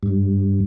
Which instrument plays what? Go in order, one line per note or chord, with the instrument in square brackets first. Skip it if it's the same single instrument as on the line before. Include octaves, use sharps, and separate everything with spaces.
[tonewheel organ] G2